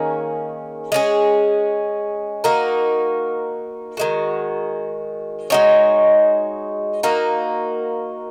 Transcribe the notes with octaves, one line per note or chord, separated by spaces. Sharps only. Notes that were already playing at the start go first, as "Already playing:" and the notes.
Already playing: D#3 A#3 C#4 G#4
G#3 C#4 G#4
A#3 D#4 F#4 A#4
D#3 G#3 F#4
G#3 D#4 F#4 C#5
A#3 D#4 F#4